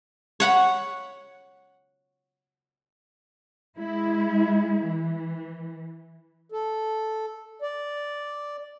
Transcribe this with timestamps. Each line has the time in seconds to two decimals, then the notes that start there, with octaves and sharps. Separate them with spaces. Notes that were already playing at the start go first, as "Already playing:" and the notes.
0.40 C#5 F#5 B5
3.78 G#3 E4
4.84 E3
6.52 A4
7.62 D5